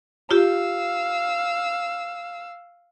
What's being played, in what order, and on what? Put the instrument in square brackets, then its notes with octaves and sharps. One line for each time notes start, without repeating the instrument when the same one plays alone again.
[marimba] F4 G4 [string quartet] F5 E6